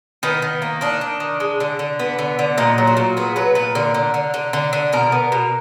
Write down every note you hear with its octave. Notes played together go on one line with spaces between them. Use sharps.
D#3 B3
D#3
A#3
D#3 D4
D#3
D#3
G#3
D3
D3
B3
D3
D3
A#2 D#4
F#3
F#4
A#2
B3 G#4
F#3 B4
A#2 B4
D3 A#4
D3
D3
D3
D3
D3
B2 A#4
B3
B2